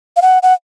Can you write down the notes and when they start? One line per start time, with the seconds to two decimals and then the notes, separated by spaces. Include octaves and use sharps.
0.17 F5
0.22 F#5
0.43 F#5